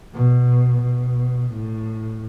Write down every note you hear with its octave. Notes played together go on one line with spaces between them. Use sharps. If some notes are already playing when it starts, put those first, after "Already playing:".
B2
B2
A2